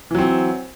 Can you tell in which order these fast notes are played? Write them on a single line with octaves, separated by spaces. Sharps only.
E3 F#3 C4